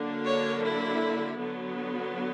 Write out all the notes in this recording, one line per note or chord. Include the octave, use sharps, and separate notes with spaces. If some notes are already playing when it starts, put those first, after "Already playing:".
Already playing: D3 F#3 A#3 D4
C#5
E4
D3 F#3 B3